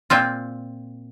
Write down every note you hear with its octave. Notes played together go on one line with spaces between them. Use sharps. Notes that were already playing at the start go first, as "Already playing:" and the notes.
A#2 C4 F4